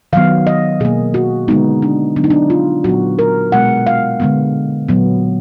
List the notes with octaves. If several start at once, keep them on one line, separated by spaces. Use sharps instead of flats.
D#3 F#3 B3 F5
D#5
B2 A#3 G#4
F#4
D3 G#3 B3 D#4
D4
D3 F#3 B3 D4
D#4
D4
F4
A#2 F#3 B3 F#4
A#4
B2 G#3 B3 F#5
F5
D3 G#3 B3
A#2 F#3 B3